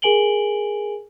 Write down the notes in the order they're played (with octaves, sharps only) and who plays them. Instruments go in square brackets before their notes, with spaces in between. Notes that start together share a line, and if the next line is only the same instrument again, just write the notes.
[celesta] G#4 A#4 G#5 D7 F#7 G7